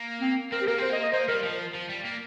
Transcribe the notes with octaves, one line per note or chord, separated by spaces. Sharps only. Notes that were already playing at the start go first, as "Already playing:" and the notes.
Already playing: A#3
C4
C4 A#4
G4
A#3 A#4
C4 C5
A#3 D#5
D#5
A#3 C5
G3 A#4
F3
F3
G3
A#3